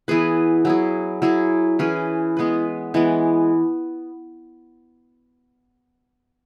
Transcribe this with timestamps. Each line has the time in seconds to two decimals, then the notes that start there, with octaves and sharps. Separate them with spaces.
0.08 E3 B3 G#4 B4
0.65 F#3 E4 G#4
1.22 F#3 E4 G#4
1.79 E3 C#4 G#4 B4
2.37 G#3 B3 G#4 B4
2.94 E3 G#3 B3